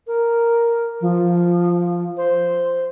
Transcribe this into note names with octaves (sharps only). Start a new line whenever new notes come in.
A#4
F3
C5